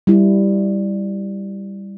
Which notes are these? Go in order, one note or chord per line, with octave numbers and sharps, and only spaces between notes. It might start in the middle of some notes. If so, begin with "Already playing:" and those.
G3 E4